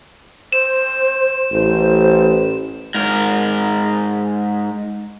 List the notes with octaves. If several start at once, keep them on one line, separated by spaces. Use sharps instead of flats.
C5 E7
A1 C5
G#2 A#4